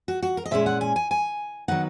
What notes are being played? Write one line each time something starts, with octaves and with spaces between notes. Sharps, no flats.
F#4
F#4
A#4
D#5
A#2 G#3 C#4 E4 E5
F#5
G#5
G#5
G#5
D#3 F#3 B3 D#4 F#5